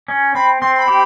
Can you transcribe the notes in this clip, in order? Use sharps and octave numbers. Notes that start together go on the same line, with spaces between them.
C#4
C4 B5
C4 C6
C6
B5
G4